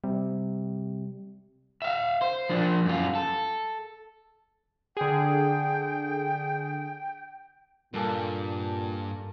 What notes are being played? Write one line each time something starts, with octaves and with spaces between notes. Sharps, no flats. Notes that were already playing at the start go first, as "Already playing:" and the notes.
C3 G3
E5 F5
C5
F3 D4
F#2 F4
A4
D3 G#4 G5
G2 A#2 A#3 A4 G#5